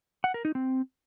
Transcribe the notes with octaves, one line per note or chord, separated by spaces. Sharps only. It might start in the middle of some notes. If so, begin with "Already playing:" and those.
F#5
A#4
D#4
C4